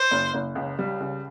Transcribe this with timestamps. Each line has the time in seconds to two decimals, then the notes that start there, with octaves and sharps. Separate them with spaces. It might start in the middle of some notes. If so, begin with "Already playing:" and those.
Already playing: C5
0.11 F#1
0.34 F#1
0.55 C#2
0.79 G3
1.00 C#2